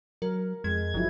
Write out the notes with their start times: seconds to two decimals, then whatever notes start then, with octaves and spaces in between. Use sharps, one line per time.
0.22 F#3 A#4
0.64 F2 G#3 G#6
0.94 G1 F3 F#3 E4